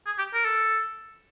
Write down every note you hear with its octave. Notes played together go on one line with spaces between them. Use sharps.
G#4
G4
A#4
A4